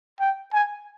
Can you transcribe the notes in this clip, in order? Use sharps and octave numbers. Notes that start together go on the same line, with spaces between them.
G5
G#5